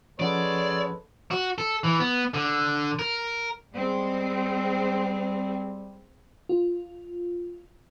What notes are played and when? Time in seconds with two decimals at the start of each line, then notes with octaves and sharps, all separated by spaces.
0.20 F3 G#3 C#4 A4 B4 C#5 D5 F#5
1.31 F#4
1.58 A4
1.84 E3
2.00 B3
2.34 D3
2.99 A#4
3.74 G3 G#3 C4
6.49 F4